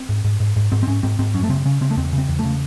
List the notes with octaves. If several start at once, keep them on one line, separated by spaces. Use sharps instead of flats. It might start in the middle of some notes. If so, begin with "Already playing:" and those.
Already playing: C4
G#2
G#2
G#2
G#2
G#2 C4
C4
G#2 C#4
G#2 C4
G#2 C4
F#2 C#4
A3
C#3 C4
C#3 C#4
C#3 C4
A3
E2 C4
C#3
C4
E2
A3
C#3